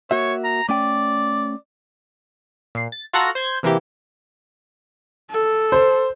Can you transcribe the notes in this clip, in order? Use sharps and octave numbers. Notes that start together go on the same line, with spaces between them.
A#3 F#4 C#5 E5
A#5
A3 C#4 D5 G5
A#2 C7
A6
F4 F#4 A4 F#5 A#5
C5 G6 G#6
C3 E3 A#3 E4 G4
A4
C5